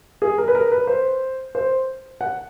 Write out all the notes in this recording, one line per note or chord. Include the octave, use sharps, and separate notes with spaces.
G#4
A#4
B4
A#4
B4
C5
C5
F#5